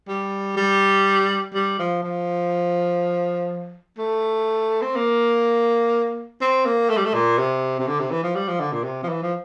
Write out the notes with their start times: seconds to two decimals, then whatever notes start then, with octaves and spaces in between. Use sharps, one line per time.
0.08 G3
0.57 G3
1.54 G3
1.79 F3
2.03 F3
3.98 A3
4.82 C4
4.95 A#3
6.41 C4
6.65 A#3
6.89 A3
6.97 G3
7.05 A3
7.14 A#2
7.39 C3
7.79 C3
7.87 D3
8.00 C3
8.11 E3
8.23 F3
8.35 G3
8.48 F3
8.60 D3
8.72 A#2
8.84 C3
9.03 F3
9.09 E3
9.22 F3